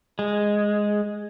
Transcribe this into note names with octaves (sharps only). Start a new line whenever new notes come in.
G#3